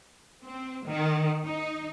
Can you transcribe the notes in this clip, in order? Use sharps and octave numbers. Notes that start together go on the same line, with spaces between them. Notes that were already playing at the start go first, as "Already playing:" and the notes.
C4
D#3
D#4